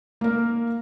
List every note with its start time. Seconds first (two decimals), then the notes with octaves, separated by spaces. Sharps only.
0.21 A#3 A#4